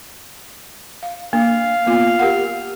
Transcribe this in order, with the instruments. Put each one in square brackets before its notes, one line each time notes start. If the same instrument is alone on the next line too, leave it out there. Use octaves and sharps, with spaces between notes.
[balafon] F5
[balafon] A#3 D4 [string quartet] F5
[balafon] A#3 B3 F4
G4 A#4 F#5